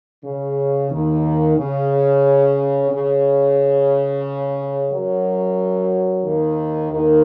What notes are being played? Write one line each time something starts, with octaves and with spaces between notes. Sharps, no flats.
C#3
D#2 D#3
C#3
C#3
F#2 F#3
D#2 D#3
D#2 D#3